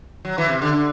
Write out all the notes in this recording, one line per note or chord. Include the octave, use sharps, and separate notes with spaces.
F#3
E3
C3
D3
D3